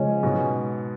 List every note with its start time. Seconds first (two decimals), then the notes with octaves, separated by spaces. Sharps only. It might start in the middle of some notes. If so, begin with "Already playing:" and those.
Already playing: C#3 F3 G#3 C#4
0.23 G#2 B2